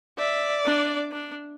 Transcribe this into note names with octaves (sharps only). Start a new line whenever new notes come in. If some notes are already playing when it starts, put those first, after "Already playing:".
D5 E5
D4
D4